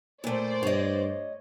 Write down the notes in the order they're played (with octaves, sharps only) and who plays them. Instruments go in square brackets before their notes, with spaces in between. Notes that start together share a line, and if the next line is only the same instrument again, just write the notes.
[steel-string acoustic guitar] A#2 A3 [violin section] C5 D5
[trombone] G2 [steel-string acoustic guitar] C#5 D#5